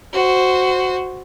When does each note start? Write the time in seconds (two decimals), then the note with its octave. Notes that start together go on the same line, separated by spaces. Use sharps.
0.14 F#4 C5